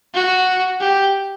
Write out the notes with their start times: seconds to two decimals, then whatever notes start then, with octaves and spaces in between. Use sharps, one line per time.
0.14 F#4
0.80 G4